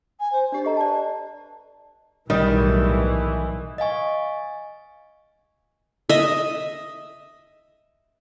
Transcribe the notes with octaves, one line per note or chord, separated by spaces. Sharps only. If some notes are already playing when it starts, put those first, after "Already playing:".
G#5
C5
D4 G4 D5
G4 A4 D#5 A#5
B4 D5 A5
B1 A2 D#3 E3 G3
D#5 F5 G#5 C#6
D#5 E5